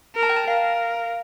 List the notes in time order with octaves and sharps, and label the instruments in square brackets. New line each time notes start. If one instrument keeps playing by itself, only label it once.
[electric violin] A#4
[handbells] A5
G5
A5
[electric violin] A#4 [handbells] F5